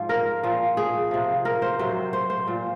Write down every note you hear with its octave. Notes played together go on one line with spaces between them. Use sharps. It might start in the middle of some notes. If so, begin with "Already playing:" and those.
Already playing: G#2 F3
A#4
A#2 F3
G#4
C3 F3
A#4
C5
C3 F#3 C5
C5
C5
A#2 F3